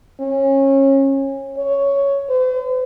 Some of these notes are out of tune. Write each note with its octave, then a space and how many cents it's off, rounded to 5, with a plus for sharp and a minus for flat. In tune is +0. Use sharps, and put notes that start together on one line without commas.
C#4 -25
C#5 +5
C5 -45